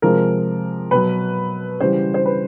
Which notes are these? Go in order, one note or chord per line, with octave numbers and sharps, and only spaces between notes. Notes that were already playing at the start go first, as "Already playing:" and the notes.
C3 F3 G#3 A#4
B2 F#3 B4
C#3 E3 G3 C5
C5
B4